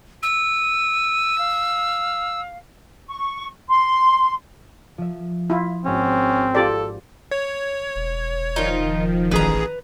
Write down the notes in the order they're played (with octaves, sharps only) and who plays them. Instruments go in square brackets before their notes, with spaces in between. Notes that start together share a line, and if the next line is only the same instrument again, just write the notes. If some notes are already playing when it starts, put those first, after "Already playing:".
[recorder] E6 [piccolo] D#7
[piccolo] F5
[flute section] C#6
C6
[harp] F3 E5
[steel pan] E4 F4 [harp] D#6
[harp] G#1 F#4 [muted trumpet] C4 [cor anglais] C#4
[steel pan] F4 G4 D5 [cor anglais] A4
[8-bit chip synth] C#5
[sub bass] E1
[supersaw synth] D#3 F3 [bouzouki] D#4 F4
[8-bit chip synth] A1 G#4 [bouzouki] B4 A#5